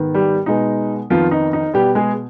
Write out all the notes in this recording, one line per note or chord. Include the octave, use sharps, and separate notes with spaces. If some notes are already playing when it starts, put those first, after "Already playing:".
Already playing: G#2 D#3 B3
G3 G4
B2 G#3 B3 D#4
F2 D#3 F3 B3 F4
D#4
D#4
B2 G3 B3 G4
G#3 G#4